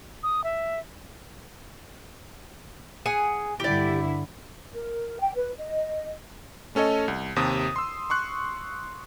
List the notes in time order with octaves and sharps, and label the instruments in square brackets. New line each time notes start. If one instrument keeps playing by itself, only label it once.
[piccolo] D#6
E5
[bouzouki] G#4 F#5 G#5
[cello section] G2 D3 E4 [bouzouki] G4 D5
[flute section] A#4
G5
B4
D#5
[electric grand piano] A3 C#4 A4 C#5 D#5
C2
D#2 C3 D#6
C6 E6
C6 C#6 F#6